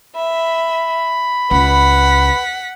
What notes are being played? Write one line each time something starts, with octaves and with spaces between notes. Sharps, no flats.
E5 B5
C#2 B4 F#5 B6